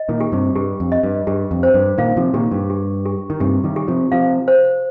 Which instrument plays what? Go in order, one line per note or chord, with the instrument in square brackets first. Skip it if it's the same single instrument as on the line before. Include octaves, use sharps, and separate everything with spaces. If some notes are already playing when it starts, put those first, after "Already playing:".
Already playing: [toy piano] D#5
[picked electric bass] A#2 D#3
[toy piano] G4
[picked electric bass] G2 C3
[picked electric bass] G2 [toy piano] G4
[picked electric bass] F2
[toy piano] D#5
[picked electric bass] G2
[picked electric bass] G2 [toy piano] G4
[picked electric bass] F2
[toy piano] C5
[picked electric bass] G2
[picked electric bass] A#2 D#3 [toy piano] F5
[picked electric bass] C3 F3
[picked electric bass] A#2 D#3 [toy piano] G4
[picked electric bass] G2
[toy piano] G4
G4
[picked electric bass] D#3
[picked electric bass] G2 C3 [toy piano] G4
[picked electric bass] D#3 G3
[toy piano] G4
[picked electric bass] C3 F3
[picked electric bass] C3 F3 [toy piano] F5
[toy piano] C5